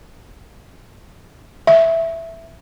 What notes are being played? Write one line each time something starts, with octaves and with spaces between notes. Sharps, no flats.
E5